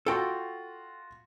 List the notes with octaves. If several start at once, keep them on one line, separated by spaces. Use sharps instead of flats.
F4 F#4 A4 G5